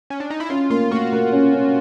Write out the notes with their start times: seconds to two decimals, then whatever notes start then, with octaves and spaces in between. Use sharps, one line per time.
0.10 C#4
0.20 D4
0.30 D#4
0.40 E4
0.49 C#4 F4
0.70 A#3 F4
0.91 A#3 F#4
1.12 A#3
1.32 C#4
1.53 C#4